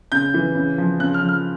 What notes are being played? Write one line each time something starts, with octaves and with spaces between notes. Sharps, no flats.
C#3 G6
E3
C#3
F3
C#3 F#6
F6
F3
F6